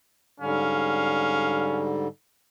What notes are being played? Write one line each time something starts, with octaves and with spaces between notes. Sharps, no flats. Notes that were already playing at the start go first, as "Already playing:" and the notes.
G#2 D3 G3 C#4 F5